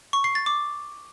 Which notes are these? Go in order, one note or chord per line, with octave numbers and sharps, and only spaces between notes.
C#6
C7
A6
D6